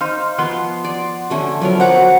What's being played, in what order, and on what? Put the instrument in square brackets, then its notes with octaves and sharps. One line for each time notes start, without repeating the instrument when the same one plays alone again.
[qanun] D#4 [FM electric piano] C5 F5
[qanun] F3 B3 [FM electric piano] F#5 C6
[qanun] D5
D3 A3 C#4
[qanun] F3 B3 A#4 [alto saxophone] F#3
[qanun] F#3 A#5 D6 [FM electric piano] C5 [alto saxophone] F#5